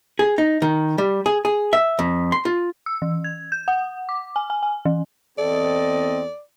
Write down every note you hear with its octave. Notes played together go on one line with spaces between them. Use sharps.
G#4
D#4
D#3
G3
G#4
G#4
E5
F2
C6
F4
E6
E3
G#6
G6
F#5
D6
G#5
G#5
G#5
E3
E2 C4 A4 D5 D#5